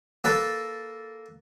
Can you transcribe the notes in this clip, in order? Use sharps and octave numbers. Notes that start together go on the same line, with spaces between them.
A#3 A4 B4